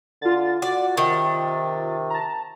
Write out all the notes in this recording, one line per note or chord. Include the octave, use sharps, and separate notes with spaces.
D3 F4 A6
F#4 D5
C3 D#3
A5 A#5